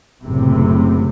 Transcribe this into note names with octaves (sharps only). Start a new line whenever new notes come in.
F#1 A2 C3